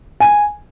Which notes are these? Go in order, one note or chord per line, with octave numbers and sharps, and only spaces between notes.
G#5